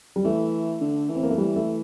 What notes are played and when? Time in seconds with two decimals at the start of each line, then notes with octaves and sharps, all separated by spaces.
0.16 G3
0.24 E3 A3
0.81 D3
1.09 E3
1.16 C4
1.23 A#3
1.30 A3
1.37 E3 G3
1.56 A3